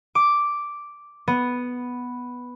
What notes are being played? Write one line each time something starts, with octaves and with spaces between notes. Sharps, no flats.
D6
B3